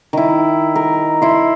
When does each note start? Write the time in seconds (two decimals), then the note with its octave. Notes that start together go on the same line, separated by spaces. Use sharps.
0.13 D#3 E4
0.76 A#4
1.22 E4 C6